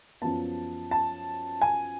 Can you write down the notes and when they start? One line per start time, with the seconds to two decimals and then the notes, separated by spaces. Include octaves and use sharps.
0.22 F#2 F3 B3 A5
0.91 A5
1.61 G#5